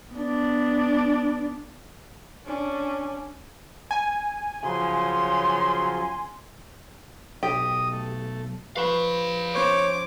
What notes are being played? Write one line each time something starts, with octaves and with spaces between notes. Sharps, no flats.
B3 D4
C#4 D4
G#5
C#3 F3 F#3 C6
B1 G4 D#5 D#6
A3
F3 B4 F5 B5 C#6
C#4 C5 C#5 D6 G6